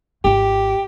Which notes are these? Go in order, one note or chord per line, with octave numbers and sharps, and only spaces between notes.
G#1 F4 G4